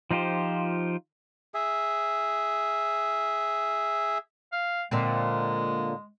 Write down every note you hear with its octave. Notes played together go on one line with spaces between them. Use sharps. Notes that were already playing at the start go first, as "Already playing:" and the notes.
F3 D#4 F4 G4 C5
G#4 E5
F5
A#2 D3 G#3 C4